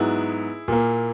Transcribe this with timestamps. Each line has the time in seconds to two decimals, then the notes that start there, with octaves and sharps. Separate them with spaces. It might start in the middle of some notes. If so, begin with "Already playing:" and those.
Already playing: G#2 F#3 B3 E4 G#4
0.68 A#2 A#3